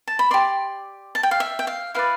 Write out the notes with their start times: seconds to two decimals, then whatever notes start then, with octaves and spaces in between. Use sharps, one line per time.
0.08 A5
0.19 B5
0.31 G4 D5 C6
1.15 A5
1.23 G5
1.31 F5
1.40 E5
1.59 G5
1.67 F5
1.94 E4 B4 D5 F5